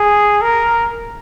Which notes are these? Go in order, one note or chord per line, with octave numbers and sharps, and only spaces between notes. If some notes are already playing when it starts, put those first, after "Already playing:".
Already playing: G#4
A#4